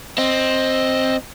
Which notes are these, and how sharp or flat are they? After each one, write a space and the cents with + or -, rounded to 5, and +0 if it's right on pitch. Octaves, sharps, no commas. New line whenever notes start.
C4 +5 D#5 +0